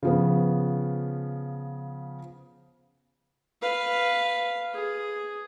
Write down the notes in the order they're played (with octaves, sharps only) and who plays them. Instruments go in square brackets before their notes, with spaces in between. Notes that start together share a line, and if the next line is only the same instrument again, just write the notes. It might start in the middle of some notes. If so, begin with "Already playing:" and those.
[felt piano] C#3 F3 B3
[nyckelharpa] B4 F5
G#4